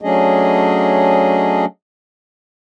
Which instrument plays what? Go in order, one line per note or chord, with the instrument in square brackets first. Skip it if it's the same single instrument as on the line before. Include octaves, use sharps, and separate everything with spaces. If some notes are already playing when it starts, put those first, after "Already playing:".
[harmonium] F#3 A3 C#4 D4 G#4 D#5